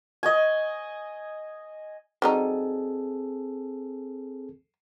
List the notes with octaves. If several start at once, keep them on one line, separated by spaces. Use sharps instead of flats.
D#5 G#5
F#3 G3 C4 D#4 G#4 A4